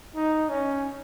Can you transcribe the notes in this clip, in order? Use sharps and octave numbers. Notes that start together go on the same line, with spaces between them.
D#4
C#4